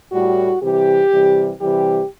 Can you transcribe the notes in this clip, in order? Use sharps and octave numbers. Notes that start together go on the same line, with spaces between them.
A2 G3 F#4
C3 E3 G3 G4
C3 E3 G3
C3 E3 G3 G4